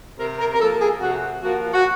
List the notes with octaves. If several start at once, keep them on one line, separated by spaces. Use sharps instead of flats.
C3 A#4
A#4
A#4
F3 A#3 A4
G#4
C3 F#4
F3 A#3 F#4
F#4